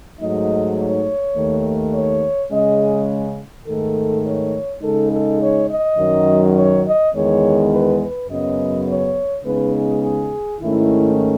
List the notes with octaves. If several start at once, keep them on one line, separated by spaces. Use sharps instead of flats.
G#2 F#3 A3 D#4 D#5
C#5
D#2 D#3 A3
C#5
C#3 G#3 C#4 D#5
G#2 D#3 A3 A4
C#5
C#3 G#3 D#4 A4
A4
C#5
D#5
F#2 D#3 F#3
C#5
D#5
E2 D#3 G#3 B3 C#5
B4
B4
F#2 C#3 F#3 B3 D#5
C#5
C#3 G#3 B3 D#4 B4
G#4
G#4
G#2 D#3 A3 C#4 E4